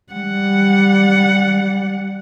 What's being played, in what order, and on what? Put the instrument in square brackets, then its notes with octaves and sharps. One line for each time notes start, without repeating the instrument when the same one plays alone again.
[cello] G3 F#5